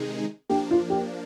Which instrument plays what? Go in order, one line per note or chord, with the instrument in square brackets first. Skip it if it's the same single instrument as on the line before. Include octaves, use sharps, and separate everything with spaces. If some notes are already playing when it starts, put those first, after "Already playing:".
Already playing: [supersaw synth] C3 D#3 G#3 D#4 G#4
[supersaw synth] F3 A#3 D4 [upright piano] G4
[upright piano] F4
G4